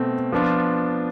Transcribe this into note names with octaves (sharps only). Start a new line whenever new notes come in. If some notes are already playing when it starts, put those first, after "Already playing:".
Already playing: B2 A3 C4
F3 B3 D4 F4